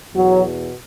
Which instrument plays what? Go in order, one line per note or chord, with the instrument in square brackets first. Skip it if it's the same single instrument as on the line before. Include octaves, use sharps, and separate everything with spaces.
[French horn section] E2 B2 F#3